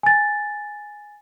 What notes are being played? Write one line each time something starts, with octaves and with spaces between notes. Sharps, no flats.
G#5 A6